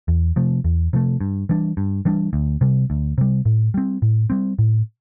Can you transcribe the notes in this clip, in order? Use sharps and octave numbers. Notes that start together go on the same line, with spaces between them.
E2
C3 F3 A3
E2
C3 F3 A3
G2
E3 G3 D4
G2
E3 G3 D4
D2
C3 G3
D2
C3 G3
A2
G3 C4
A2
G3 C4
A2